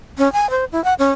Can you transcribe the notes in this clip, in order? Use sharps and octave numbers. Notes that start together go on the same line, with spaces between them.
C#4
G#5
C5
E4
F#5
C#4